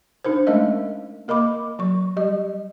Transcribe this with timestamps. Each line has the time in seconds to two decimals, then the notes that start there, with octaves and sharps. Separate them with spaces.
0.25 D4 D#4 A#4 C5
0.46 G#3 A3 C#4 A#4 D#5 F5
1.28 A#3 A#4 D#5 B5 D6
1.79 F#3 C#6
2.17 G3 G4 D#5